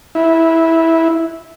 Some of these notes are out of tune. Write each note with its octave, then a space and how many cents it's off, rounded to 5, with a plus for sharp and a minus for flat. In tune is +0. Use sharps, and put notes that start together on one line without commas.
E4 -10